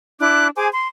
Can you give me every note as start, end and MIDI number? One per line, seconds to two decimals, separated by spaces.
0.20 0.47 62
0.20 0.47 64
0.20 0.47 86
0.20 0.47 90
0.55 0.68 68
0.55 0.68 72
0.55 0.68 80
0.55 0.68 86
0.74 0.87 84